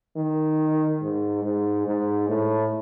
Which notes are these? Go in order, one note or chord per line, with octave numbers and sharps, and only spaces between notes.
D#3
G#2
G#2
G#2
A2